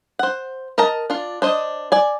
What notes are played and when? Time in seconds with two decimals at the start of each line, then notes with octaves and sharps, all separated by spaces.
0.19 C5 F#5
0.78 A#4 D#5 A5 A#5
1.10 D4 F4
1.42 D4 C5 D#5
1.92 D5 G#5